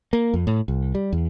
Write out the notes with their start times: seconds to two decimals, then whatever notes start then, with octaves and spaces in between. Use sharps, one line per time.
0.13 A#3
0.34 F2
0.47 A2
0.68 C2
0.95 G3
1.12 E2